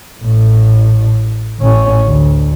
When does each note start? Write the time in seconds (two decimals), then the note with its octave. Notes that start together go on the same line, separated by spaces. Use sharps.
0.22 A1 A2
1.59 A1 C#4
2.05 D2